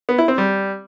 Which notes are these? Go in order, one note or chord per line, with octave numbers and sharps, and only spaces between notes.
B3
E4
C4
G3